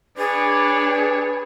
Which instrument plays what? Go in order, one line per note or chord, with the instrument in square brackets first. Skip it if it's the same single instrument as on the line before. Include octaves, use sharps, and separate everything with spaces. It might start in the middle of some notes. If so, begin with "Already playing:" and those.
[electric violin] D4 C#5 [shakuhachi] G#4 [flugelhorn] B4 [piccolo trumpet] D5